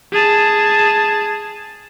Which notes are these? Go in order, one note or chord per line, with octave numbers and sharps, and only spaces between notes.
G#4 A5